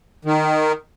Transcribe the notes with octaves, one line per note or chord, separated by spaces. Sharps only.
D#3